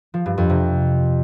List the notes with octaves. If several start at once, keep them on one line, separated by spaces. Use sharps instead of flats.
F3
G2
F2
C3